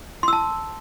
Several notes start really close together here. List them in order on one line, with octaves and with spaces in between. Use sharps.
C6 E6 A5